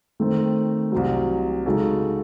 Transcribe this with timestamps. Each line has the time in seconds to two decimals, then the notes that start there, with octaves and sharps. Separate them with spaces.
0.20 D#3 A3 C4
0.92 C2 C3 F#3
1.66 C#3 G#3 D#4 F#4 A4